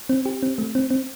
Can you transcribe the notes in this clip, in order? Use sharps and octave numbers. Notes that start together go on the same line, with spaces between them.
C4
G4
C4
A3
C4
C4